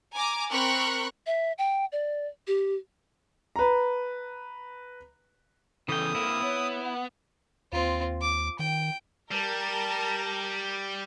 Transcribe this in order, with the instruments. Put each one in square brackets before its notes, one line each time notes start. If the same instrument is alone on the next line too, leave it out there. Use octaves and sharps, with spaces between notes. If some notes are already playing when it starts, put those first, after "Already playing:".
[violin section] G#5 A#5 D6
C4 A#4 B5 C#6 F#6
[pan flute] E5
G5
D5
G4
[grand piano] B4 A#5
[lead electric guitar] E2 C#3 [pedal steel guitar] E3 G5 [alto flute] A4 [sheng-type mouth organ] D#6
[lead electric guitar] A#3 C4 [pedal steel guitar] E4
[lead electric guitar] B3 [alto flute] C#5
[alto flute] F#5
[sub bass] D#2 [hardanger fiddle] C4 F4
[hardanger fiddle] D6
[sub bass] D#3 [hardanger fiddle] G5
[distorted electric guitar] G3 [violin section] A#4 A5 A#5